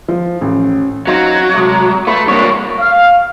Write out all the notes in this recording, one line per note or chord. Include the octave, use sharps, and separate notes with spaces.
F3
A1
F#3 C4 D#4 F4
C3 G#3 A3
A3 F4 B4
C2 A#3 D4 C#5
F5